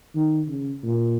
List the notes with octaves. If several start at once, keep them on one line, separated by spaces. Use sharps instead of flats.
D#3
C#3
A#2